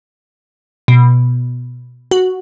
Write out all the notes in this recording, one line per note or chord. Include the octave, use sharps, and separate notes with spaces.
B2
F#4